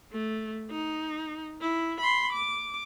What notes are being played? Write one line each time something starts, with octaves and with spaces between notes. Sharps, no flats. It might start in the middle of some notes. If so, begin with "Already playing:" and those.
A3
D#4
E4
B5 C6
D6